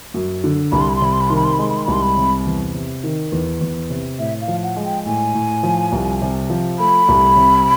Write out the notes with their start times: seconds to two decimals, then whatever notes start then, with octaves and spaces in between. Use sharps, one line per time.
0.14 F#2
0.44 D3
0.72 C2 B5
0.81 C6
0.89 B5
0.96 C6
1.01 C3 B5
1.13 C6
1.21 B5
1.29 D#3 C6
1.36 B5
1.44 C6
1.53 B5
1.59 G#3 C6
1.69 B5
1.77 C6
1.85 C2 B5
1.93 C6
2.02 B5
2.17 C3
2.46 E2
2.74 C3
3.03 D#3
3.32 E2
3.61 E2
3.90 C3
4.19 A2 E5
4.41 F5
4.48 F3
4.63 F#5
4.76 G#3
4.84 G5
5.06 A2 G#5
5.34 A2
5.63 F3
5.92 C2
6.21 C3
6.50 F3
6.79 A3 B5
7.08 C2
7.36 C3